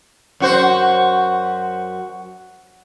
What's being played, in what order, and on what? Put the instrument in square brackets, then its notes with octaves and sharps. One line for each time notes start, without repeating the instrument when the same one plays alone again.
[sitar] F#2 F#4 C5